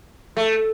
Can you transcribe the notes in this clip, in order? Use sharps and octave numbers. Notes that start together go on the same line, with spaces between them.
A3